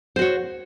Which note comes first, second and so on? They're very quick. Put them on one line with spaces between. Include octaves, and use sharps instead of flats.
C5 F#4 C#5